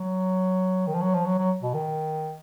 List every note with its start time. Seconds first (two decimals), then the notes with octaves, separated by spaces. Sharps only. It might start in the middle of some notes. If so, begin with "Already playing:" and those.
Already playing: F#3
0.87 D#3
0.95 F3
1.02 F#3
1.14 F3
1.26 F#3
1.38 F#3
1.62 B2
1.74 D#3